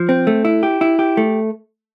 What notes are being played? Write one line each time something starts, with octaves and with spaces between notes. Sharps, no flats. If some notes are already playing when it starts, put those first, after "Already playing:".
Already playing: F3
C4
A3
E4
G4
E4
G4
A3